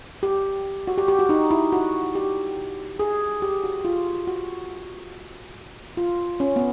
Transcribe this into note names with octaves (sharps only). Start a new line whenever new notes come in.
G4
F#4
G4
G4
F#4
D#4
E4
F#4
G4
G#4
G4
F#4
F4
F#4
F4
C#4
B3